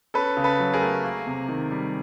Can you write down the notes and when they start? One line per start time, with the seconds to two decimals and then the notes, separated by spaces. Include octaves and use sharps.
0.14 C#4 A4 B4
0.37 C#3
0.44 A4 B4
0.60 F#3
0.73 G#4 A#4
0.81 A3
1.03 A#3
1.27 C3
1.49 D#3
1.71 G3